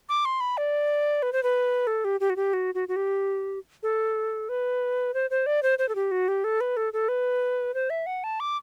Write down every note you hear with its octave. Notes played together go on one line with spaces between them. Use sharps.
D6
C6
B5
D5
B4
C5
B4
A4
G4
G4
F#4
G4
F#4
F#4
F#4
G4
A4
B4
C5
C5
D5
C5
C5
A4
G4
F#4
G4
A4
B4
A4
A4
B4
C5
E5
F#5
A5
D6